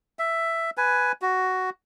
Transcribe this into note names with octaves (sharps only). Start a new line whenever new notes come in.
E5
B4 G#5
F#4